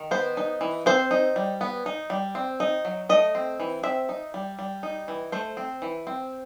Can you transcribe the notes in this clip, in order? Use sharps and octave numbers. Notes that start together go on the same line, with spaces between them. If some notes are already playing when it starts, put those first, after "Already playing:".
Already playing: D#3
B3 C5
D#4
E3
C4 C5
D#4
G3
B3
D#4
G3
C4
D#4
F#3
A3 D#5
C4
E3
C4 E5
D#4
G3
G3
D#4
E3
A3 C5
C4
E3
C4